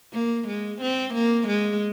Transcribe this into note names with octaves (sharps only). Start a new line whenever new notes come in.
A#3
G#3
C4
A#3
G#3